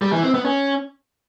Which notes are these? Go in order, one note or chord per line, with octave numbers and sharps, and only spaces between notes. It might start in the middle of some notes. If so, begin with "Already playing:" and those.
G3
E3
C4
B3
C#4